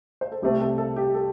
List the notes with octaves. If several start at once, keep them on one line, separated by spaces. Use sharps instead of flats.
C5
A4
C2 C3 A3 C4 G4
A4
A4
G4
A4